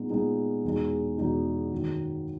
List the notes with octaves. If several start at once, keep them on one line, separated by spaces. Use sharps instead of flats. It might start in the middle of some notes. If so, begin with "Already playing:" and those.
Already playing: A#2 G#3 B3 D#4
A#2 G#3 B3 D#4
E2 B2 G#3 D#4
E2 B2 G#3 D#4
F#2 D#3 F#3 A#3